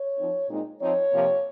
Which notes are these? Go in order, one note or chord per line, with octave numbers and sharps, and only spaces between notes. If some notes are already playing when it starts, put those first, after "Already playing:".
Already playing: C#5
F3 C4 D#4
A#2 G#3 C4 D#4
F3 C4 D#4 C#5
C3 F3 A#3